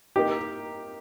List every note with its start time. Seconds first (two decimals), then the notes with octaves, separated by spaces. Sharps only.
0.16 A#3 D#4 G4